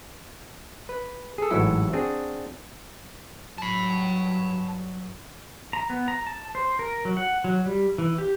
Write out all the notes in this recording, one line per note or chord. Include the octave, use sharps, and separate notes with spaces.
B4
G#4 A4
A1 G#2 F#3 E4 A4
C4 D4 F#4 G#4
G2 F#3 A5 B5
A#5
B3
A#5
A5
C5
A#4
F#3
F#5
F#3
G3
E3
G4